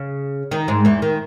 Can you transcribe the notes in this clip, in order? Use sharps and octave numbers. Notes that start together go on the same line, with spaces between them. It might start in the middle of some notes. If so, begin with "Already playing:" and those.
Already playing: C#3
D#3 D#4
G#2 G#3
E2 E3
D#3